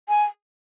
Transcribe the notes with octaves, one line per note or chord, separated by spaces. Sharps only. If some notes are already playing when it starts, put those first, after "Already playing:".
G#5